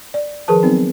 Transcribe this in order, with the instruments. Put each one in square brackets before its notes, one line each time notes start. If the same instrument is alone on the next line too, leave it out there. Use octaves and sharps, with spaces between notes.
[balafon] D5
D#3 F3 G#4 A#4 B4 A5
F#3 B3 C4 D#4